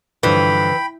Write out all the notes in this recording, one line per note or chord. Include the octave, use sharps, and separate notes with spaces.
G2 D3 E3 F3 G5 B5